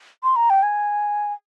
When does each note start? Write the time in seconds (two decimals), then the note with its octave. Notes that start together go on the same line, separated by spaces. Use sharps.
0.23 C6
0.36 A#5
0.50 G5
0.63 G#5